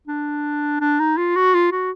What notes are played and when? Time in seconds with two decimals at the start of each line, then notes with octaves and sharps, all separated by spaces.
0.07 D4
0.81 D4
1.00 D#4
1.17 F4
1.36 F#4
1.54 F4
1.72 F#4